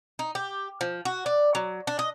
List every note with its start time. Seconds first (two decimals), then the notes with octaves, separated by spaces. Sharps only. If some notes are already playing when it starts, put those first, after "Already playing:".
0.19 D#4
0.35 G4
0.81 F3
1.05 F#4
1.26 D5
1.55 F#3
1.87 D4
1.99 D#5